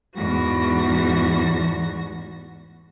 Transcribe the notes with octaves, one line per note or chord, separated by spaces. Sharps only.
E2 G#2 F#4 A#6